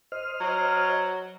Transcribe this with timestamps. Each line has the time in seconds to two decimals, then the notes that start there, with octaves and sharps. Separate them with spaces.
0.12 C5 D#5 F6
0.41 F#3